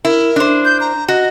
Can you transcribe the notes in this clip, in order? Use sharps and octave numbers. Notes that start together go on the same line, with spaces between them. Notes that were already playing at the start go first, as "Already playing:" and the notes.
E4 A#4
D4 C5
G6
A#5
F#4 D#5